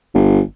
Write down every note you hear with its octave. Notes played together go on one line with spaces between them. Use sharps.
G1